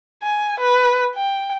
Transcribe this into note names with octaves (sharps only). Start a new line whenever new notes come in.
G#5
B4
G5